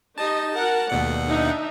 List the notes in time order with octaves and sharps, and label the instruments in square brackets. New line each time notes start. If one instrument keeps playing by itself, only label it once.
[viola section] D#4 G4 D#5 [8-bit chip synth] A5
[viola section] F#4 A#4 F#5
[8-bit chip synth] D#2 B2 F#5 [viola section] A3 D5
[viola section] D4 D#4 E5